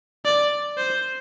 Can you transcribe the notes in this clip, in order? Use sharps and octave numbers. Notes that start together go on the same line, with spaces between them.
D5
C5